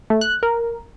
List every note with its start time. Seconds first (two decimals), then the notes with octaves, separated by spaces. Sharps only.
0.10 A3
0.21 F#6
0.43 A#4